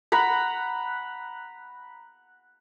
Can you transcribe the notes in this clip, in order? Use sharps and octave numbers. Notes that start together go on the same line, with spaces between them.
F#5 A#5 B5